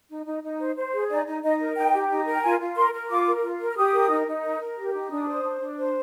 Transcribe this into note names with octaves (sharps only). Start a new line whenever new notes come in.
D#4
D#4
D#4
C5
C5
G#4
D#4 D5
D#4
D#4 D#5
A#4
D#4 G5
G4
D#4
A#4
G5
F4 G#5
F4
A#4 C6
A#4
F4 D6
A#4
F4
A#4
F6
G4 D#6
A#4
D#4
D#4
A#4
A#4
G4
D#4
D4 D#6
C5
D4
D4
C5